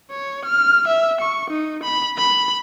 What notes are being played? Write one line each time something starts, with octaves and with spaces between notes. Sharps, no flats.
C#5
F6
E5
C#6
D#4
B5
B5